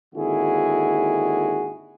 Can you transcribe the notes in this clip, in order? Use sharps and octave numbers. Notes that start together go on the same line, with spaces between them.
G#1 D#2 D3 E4 F#4 G#4